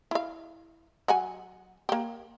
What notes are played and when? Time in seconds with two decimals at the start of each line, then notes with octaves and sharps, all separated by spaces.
0.11 E4 F5
1.08 F#3 F#5 G#5
1.89 A#3 G4